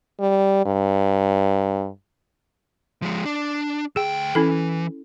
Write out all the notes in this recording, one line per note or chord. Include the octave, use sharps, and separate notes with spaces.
G3
G2
F3 G#3
D4
D2 G#4 G5
E3 C#4 E4 A4